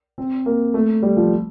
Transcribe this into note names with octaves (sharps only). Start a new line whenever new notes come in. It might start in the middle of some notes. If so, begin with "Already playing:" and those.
C4
A#3
A3
G3
F3